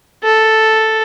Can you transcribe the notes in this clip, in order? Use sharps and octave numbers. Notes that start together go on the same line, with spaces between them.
A4